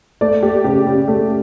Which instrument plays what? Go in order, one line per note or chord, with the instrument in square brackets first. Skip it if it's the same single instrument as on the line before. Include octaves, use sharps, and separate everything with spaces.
[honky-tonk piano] A3 D5
A3 G4
C#3 G4
C#3
A3